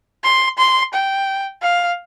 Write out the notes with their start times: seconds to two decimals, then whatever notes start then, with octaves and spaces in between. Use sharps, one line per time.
0.23 C6
0.58 C6
0.94 G5
1.62 F5